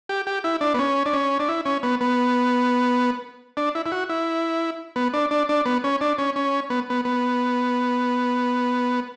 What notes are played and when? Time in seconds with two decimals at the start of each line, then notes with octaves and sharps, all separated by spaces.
0.09 G4
0.27 G4
0.44 E4
0.61 D4
0.74 B3
0.79 C#4
1.06 D4
1.13 C#4
1.39 D4
1.49 E4
1.65 C#4
1.83 B3
2.01 B3
3.57 D4
3.75 E4
3.86 E4
3.92 F#4
4.09 E4
4.96 B3
5.13 D4
5.31 D4
5.49 D4
5.66 B3
5.84 C#4
6.01 D4
6.18 C#4
6.36 C#4
6.70 B3
6.90 B3
7.05 B3